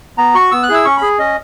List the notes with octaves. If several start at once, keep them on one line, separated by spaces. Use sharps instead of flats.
B3 A#5
F#4 C#6
B3 E6
F#6
E4 G#4 E6
C#4 C#6
G#4 B5
C#4 D#5